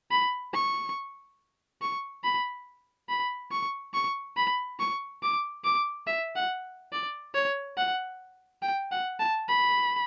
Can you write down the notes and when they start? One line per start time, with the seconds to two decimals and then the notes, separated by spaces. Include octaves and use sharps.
0.11 B5
0.54 C#6
1.82 C#6
2.24 B5
3.09 B5
3.52 C#6
3.94 C#6
4.37 B5
4.79 C#6
5.23 D6
5.64 D6
6.07 E5
6.36 F#5
6.92 D5
7.34 C#5
7.77 F#5
8.63 G5
8.92 F#5
9.19 A5
9.49 B5